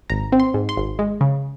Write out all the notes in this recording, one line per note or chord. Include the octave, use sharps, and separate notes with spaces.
G#1 A#5
C4
C6
G#2
C6
G#1
G#3
C#3